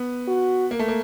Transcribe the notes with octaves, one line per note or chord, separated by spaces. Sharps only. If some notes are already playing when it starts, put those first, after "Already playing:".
Already playing: B3
F#4
A#3
A3
A#3